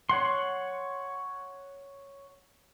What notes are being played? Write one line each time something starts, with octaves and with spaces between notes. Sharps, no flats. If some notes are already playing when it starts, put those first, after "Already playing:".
C#5 F#5 C6